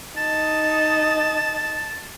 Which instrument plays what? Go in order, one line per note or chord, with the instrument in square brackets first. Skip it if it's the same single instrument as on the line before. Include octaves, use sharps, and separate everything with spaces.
[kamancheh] D#4 D#5 [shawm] A5